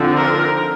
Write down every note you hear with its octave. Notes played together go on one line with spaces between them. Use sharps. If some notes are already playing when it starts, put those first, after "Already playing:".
Already playing: D3 F3 C4 D#4
A#4